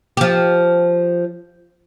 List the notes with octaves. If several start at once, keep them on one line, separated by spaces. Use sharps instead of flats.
F3 G4